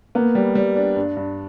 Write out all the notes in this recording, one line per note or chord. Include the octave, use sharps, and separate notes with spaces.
A#3 B3
G3
G3
D4
G2
G2